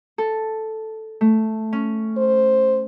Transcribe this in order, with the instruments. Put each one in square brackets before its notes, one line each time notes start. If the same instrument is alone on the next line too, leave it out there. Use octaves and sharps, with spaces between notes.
[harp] A4
A3
C#4
[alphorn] C5